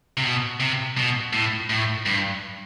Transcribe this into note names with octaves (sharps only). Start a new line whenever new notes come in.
C3
B2
C3
B2
A2
A2
G2